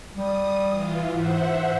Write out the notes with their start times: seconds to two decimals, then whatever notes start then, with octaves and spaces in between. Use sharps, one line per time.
0.14 G3 D#6
0.68 E3 F4
1.13 G#2 C5 E5 F#5